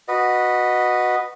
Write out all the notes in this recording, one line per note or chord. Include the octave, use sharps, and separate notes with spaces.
F#4 B4 D#5